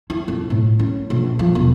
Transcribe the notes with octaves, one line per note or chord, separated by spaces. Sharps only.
E4
F2
A2
C#4
A#1
F3
E1